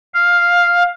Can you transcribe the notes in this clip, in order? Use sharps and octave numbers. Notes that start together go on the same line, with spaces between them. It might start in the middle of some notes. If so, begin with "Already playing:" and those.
F5